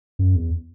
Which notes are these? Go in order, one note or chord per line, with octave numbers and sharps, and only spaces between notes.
F#2
E2